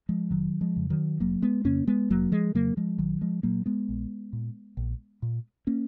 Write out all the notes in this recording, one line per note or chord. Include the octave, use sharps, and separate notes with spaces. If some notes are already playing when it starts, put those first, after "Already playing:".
F3 G#3
F1 D#3 F#3
F3 G#3
F2 C#3
D#3 F#3
F1 F#3 A#3
G#3 B3
F2 C#3 A#3 C#4
G#3 B3
F1 F#3 A#3
F3 G#3
F2 C#3 F#3 A#3
F3 G#3
A#1 D#3 F#3
F3 G#3
A#2 F#3 A#3
G#3 B3
A#1
A#2
A#1
A#2
A#3 C#4